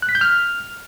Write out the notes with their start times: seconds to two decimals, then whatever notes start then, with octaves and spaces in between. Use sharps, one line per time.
0.02 F#6
0.09 B6
0.15 G6
0.21 F6